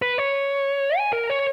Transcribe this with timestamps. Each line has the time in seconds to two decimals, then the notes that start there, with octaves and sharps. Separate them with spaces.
0.02 B4
0.18 C#5
0.98 G#5
1.13 A#4
1.30 C#5